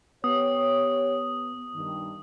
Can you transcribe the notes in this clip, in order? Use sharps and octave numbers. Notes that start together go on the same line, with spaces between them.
B3 G4 C#5 D#6
G2 D#3